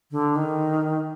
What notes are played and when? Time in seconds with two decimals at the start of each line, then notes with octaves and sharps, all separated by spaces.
0.11 D3
0.36 D#3